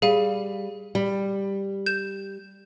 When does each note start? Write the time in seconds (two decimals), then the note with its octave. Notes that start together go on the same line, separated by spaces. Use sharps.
0.02 G3 G#4 F5 D#7
0.95 G3
1.86 G6 E7